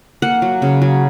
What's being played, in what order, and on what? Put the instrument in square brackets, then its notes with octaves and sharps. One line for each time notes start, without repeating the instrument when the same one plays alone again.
[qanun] A#3 F#5
F#3
C#3
F#3